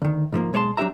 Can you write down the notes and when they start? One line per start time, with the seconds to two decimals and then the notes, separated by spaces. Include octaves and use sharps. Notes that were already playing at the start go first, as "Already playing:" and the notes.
0.02 D2 D#3
0.32 G#2 F3 A3 A#3
0.53 B1 G#3 C#5 D5 A5 C6
0.77 F#3 D4 D#4 G4 E5 A#5